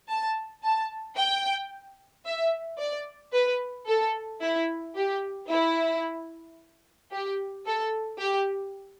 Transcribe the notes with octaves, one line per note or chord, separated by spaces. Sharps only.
A5
A5
G5
E5
D5
B4
A4
E4
G4
E4
G4
A4
G4